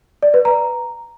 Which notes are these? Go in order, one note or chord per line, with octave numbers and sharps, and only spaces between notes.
D5
B4
A#5